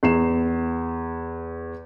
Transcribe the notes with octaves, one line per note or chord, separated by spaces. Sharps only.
E2 C7 E7